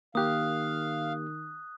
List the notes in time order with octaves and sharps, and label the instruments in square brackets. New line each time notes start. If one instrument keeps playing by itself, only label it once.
[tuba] D#3 [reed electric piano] A#3 G4 [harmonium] F5 [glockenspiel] D#6 F#6